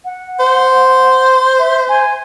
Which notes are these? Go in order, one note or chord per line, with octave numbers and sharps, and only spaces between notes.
F#5
C5
E5
G#5